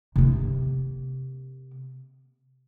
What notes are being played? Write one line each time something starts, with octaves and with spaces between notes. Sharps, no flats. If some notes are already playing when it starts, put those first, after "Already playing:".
C3 A#3